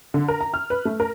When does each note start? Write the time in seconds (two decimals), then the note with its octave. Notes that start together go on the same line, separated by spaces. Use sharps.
0.14 D3
0.28 A#4
0.41 A#5
0.54 F6
0.70 B4
0.85 A3
1.00 A#4